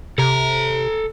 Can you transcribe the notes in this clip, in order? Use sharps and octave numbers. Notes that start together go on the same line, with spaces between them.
C3 A4 A#5